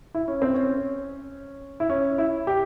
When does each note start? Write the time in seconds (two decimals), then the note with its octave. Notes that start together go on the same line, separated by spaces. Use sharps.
0.15 E4
0.28 C#4
0.42 C4
0.54 C#4
1.80 E4
1.90 C#4
2.18 E4
2.47 G4